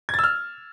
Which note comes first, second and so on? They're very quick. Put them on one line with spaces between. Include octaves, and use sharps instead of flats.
G#6 A6 E6 F6